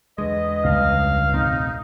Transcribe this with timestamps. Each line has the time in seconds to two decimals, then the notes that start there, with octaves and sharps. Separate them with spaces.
0.18 E2 D3 G#3 B4 D#5
0.64 C#2 G2 F5
1.34 E1 A2 C4 D#4